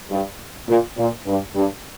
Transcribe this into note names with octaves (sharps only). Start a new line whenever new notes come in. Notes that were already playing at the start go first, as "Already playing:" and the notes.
G2
A#2
A#2
G2
G2